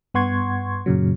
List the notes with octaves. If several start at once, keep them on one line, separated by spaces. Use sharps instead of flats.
G2 B3 F#5 C6 C#6 G#6
F#2 A#2 C#3 F#3